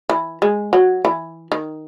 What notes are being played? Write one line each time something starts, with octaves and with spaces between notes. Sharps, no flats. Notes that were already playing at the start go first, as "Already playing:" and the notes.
E3
G#3
F#3
E3
D#3